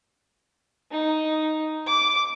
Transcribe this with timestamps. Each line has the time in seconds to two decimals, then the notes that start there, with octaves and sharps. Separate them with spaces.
0.91 D#4
1.87 D6